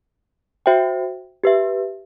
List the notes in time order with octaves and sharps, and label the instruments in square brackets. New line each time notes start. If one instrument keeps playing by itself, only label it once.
[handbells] F#4 C5 E5 G5
G4 B4 E5